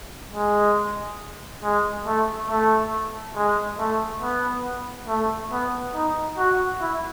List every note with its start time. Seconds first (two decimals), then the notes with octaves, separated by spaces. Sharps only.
0.33 G#3
1.63 G#3
2.06 A3
2.49 A3
3.35 G#3
3.79 A3
4.22 B3
5.08 A3
5.52 B3
5.95 D#4
6.38 F#4
6.81 E4